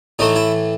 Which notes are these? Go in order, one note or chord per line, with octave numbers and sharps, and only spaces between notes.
A2 E3 A3 D#4
E4